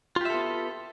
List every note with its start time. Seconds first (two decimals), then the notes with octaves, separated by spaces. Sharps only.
0.16 F4
0.21 G4
0.25 E5
0.30 A4
0.34 B3